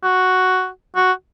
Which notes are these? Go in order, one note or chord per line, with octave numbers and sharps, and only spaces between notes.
F#4
F#4